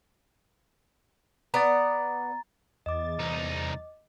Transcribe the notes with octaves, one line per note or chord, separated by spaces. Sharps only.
B3 D5 F#5 A#5 A6
E2 D#5 D6 A6
C2 D#4